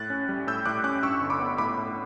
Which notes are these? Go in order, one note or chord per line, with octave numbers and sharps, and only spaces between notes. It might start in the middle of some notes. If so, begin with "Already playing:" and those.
Already playing: A2 F#6 A6
C#4
G3
A2 E6 G6
A2 D6 F#6
C#4 D6 F#6
G2 C#6 E6
G1
B5 D6
B3
A2 B5 D6
A2